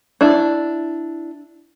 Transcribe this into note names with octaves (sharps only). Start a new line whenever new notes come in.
D4 E4